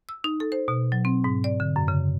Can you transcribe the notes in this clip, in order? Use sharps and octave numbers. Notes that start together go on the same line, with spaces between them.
E6
D#4
A4
C5
B2
F#3
C4
G#2
D5
D3
F#2
C#3